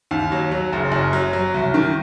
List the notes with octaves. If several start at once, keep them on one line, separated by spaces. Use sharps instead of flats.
D#2
F#3
F#3
F#1
F#2
F#3
F#3
C2
D#3